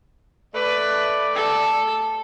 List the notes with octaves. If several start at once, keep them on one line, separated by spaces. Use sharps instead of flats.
A3 B4 D5
A4